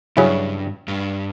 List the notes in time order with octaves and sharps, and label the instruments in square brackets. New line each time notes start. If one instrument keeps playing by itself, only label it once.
[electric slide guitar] G2 [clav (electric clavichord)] C#3 F#3 C#4 E4
[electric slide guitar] G2